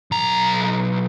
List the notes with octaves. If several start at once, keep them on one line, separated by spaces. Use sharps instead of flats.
B1 A#5